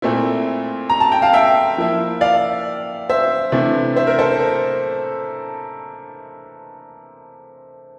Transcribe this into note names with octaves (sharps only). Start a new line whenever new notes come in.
A#2 A3 C4 E4
A#5
A5
G5
F5 A5
E5 G5
F3 A#3 E4
D5 F5
C5 E5
C3 E3 A3 D4
C5 E5
A#4
A4 C5
A#4